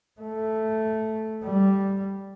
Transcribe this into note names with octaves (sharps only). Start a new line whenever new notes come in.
A3
G3